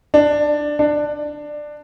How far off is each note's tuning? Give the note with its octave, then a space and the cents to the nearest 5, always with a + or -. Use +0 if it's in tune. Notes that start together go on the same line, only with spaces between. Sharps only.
D4 +10
D4 +15